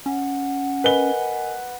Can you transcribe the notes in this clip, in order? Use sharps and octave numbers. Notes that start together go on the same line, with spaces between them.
C#4 F#5
A#4 B4 D#5 G#5 G7